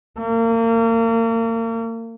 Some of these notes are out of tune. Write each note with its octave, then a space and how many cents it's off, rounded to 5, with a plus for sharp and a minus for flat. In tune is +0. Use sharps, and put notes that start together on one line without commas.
A#3 -35